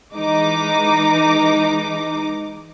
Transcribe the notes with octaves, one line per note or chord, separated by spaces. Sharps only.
E3 G#3 D#4 D6